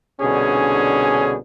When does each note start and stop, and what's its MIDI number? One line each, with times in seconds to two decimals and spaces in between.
0.21 1.35 36
0.21 1.35 47
0.21 1.35 50
0.21 1.35 61
0.21 1.35 62
0.21 1.35 68